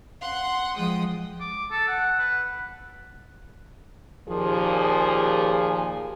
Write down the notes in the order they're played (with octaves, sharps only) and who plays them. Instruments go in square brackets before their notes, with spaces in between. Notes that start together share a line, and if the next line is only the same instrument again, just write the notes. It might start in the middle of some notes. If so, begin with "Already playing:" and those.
[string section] F#5 C6
F3 G#3 G5 D#6
[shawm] D6
A4
F#5
B4
[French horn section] D#2 A#2 F3 G#4